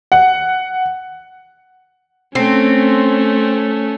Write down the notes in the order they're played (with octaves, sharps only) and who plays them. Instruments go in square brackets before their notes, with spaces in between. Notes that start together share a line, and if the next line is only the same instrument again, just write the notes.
[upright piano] F#5
[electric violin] A3 C#4 [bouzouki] C4